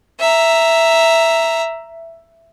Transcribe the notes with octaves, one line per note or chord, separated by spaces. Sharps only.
E5 A#5